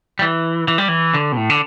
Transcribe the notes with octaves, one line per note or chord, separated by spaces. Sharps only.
G3
E3
E3
G3
E3
D3
B2
A2
D3